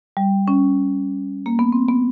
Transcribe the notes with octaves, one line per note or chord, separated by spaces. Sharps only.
G3
C#4
A#3
B3
C4
B3